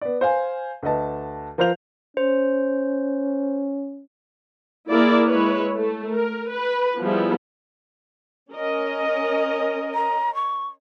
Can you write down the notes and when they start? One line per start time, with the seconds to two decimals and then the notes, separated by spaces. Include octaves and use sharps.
0.01 B3 D5
0.21 C5 F5 G#5
0.83 D2 B4 D#5 A5
1.58 F3 A#4 C5 F5 G6 F7
2.17 C#4 C5
4.91 A#3 E4 G#4 A#4 D5
5.27 G#3 E4 B4 C#5
5.75 A3
6.12 A#4
6.53 B4
7.00 F3 G3 B3 E4 G#4
8.53 C#4 A#4 D#5
9.94 A#5
10.35 C#6